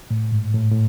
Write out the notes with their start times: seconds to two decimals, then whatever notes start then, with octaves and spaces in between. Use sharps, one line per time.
0.10 A2
0.32 G#2
0.54 A2
0.71 A2